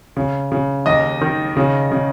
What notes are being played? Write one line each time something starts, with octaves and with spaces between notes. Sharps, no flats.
C#3
C#3
D#2 D#5
D#3
C#3
C#3